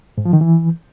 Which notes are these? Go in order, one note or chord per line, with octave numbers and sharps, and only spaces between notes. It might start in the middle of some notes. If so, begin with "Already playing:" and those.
G#2
F3
D#3
E3